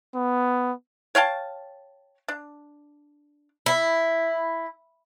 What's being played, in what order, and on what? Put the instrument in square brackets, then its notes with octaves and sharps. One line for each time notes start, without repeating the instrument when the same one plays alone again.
[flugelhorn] B3
[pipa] C#5 F5 G5 A5
D4
[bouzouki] E4